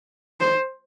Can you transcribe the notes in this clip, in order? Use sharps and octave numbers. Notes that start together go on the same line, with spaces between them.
C5